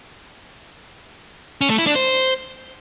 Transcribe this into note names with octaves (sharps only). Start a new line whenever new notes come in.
C#4
A3
E4
D4
C5